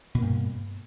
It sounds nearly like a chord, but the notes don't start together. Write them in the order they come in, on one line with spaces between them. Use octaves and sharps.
B2 A#3 G2